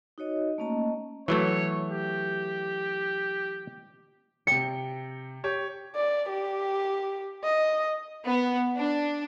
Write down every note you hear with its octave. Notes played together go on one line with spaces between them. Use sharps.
D#4 F#4 C#5 D#5
A3 A#3 C#4 D#5 A5 A#5
E3 F#3 A3 C#5
G4
C3 G5 C#7
G4 C#5
D5
G4
D#5
B3
D4